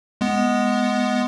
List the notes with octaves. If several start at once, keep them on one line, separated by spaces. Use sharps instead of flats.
G#3 B3